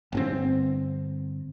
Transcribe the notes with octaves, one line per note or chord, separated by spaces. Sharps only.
G1 C3 C4